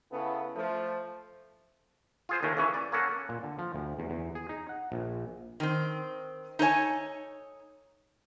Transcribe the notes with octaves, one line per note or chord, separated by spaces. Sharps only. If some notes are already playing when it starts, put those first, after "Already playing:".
C#3 B3 E4 A4
F3 A3
F4 G#4 C5
D#2 D#3 G#3 A3
C#3 E3 C#4
D5
A#3 C#4 A4 F#5
A#2
D3
F3
D2
E2
E2
G#4
D#4
F#5
A#1
D#3 C4
D#4 A4 C#5 G#5